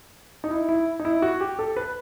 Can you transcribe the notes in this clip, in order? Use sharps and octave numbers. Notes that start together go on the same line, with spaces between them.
D#4
E4
E4
D#4
E4
F#4
G4
A4
B4